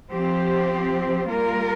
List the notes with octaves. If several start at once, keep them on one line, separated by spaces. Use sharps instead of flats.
F3 C4 G4 C5
G3 A#3 F4 A#4